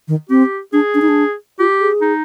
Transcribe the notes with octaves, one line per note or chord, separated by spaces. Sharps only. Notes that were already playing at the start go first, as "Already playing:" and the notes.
D#3
C4 G4
D4 G#4
D4
D#4
D4
F4 G4
G#4
D#4